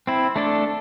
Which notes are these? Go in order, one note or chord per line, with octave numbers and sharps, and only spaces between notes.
C4 E4
A3 D4 A4